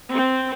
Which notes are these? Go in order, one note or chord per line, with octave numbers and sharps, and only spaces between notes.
C4